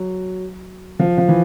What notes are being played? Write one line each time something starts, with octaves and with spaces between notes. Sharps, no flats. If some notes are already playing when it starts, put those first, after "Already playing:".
Already playing: F#3
F3
F3
E3